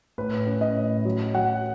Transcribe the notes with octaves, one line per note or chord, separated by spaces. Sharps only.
A2 B4
C#4
D#5
A2
F#3
F#3 F#5